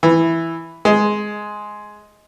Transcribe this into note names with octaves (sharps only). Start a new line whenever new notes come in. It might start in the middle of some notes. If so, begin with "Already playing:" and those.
E3
G#3